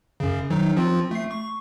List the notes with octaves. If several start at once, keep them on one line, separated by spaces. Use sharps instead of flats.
F#2 C#3
D#3 F#3 D#4
F3 C4 F4
A3 C7
C#6